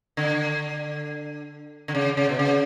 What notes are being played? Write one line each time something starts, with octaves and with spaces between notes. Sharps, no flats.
D3
D3
C#3
C#3
B2
C#3